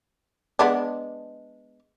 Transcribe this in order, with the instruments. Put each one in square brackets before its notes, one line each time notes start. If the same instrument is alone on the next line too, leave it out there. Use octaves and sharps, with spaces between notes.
[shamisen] G#3 B3 D4